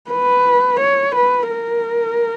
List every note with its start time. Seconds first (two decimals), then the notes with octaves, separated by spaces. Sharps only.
0.11 B4
0.80 C#5
1.15 B4
1.50 A#4